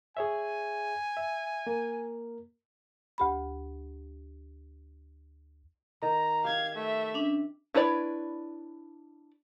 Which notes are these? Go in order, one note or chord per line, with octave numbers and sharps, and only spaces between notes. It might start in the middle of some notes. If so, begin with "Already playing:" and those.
G#4 C#5 E5 G#5
E5
A#3 A#4
D2 G4 B5
D#3 A#5
G4 F5 G#6
A3 E5
C#4 D4
D4 E4 B4 C#5 D5